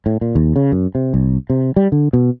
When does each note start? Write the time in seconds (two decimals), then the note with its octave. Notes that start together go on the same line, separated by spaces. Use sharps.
0.06 A2
0.21 A#2
0.35 D#2
0.56 C#3
0.72 F#2
0.95 C3
1.14 C2
1.50 C3
1.76 G3
1.92 D3
2.13 B2